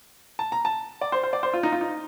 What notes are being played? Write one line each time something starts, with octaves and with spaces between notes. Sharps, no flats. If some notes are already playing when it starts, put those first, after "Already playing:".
A5
A#5
A5
D5
C5
C5
D5
C5
F4
D#4
F4
D#4